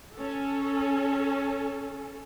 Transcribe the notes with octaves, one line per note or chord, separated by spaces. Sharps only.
C#4 A4